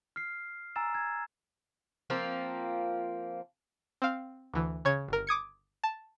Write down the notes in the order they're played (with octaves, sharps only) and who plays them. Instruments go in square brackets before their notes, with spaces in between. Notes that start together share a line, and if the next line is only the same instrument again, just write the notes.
[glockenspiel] F6 C7
G#5 A#5 E6 A6 E7
G#6
[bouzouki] F3 A#3 C4 F4
[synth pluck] C4 F5
D2 E3
C#3 C#5 G#6
G1 A#4
D6 D#6 G#6 C#7
A5